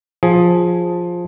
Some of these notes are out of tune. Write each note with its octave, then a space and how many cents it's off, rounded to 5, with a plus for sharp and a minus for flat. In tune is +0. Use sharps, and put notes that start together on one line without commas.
F3 +5 G#4 +0